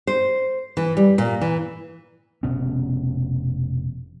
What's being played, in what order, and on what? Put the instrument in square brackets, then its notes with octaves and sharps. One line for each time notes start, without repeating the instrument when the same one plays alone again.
[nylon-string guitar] C5
E3
G3
A#2
E3
[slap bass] F1 B2 B3 C#4